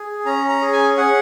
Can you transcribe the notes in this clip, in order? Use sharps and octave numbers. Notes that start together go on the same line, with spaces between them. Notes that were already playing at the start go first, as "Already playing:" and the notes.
Already playing: G#4
C#4 A#5
A#5
G#4
G#5
G#4 F#5